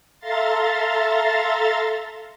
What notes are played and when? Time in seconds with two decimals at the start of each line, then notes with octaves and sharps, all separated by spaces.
0.20 A4 E5 F5 A#5 C6 A6